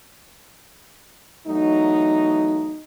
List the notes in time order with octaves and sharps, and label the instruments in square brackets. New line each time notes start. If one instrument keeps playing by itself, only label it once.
[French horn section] E2 F#3 A3 D#4